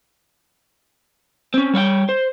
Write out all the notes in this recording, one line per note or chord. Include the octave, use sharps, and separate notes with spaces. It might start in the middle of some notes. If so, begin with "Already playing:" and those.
C4 C#4
G3 C#5 F5 G5
C5